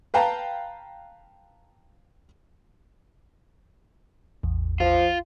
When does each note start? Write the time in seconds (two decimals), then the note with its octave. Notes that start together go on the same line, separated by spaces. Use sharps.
0.14 B4 F5 G5 A5 A#5
4.43 A1 E2
4.80 F3 F4